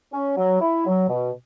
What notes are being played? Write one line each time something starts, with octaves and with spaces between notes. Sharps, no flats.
C#4
F#3
E4
F#3
B2